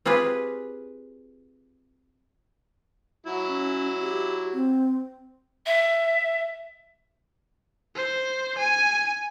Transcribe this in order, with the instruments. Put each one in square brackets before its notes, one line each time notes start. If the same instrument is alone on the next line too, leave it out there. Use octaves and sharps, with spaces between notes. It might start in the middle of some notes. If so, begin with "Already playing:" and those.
[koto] C4 F4 G4 G#4 B4
[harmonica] F#3 E4
[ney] C#4
G4
C4
[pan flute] E5
[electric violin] C5
G#5